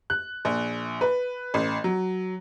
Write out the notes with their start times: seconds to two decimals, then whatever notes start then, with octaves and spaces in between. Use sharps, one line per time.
0.10 F#6
0.45 A#1
1.01 B4
1.54 A1
1.84 F#3